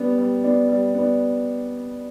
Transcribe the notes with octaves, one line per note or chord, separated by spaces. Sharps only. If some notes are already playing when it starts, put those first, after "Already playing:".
Already playing: G3 B3 D4
G3
B3 D4
G3
B3 D4